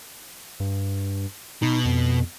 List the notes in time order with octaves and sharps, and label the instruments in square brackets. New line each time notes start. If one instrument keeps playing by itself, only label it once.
[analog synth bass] G2
[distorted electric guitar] B2 [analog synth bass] D#4
[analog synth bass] F2